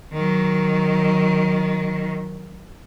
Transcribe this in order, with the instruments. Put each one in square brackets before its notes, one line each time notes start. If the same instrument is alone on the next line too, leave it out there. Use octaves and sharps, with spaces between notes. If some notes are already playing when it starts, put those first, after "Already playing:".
[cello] D#3 F#3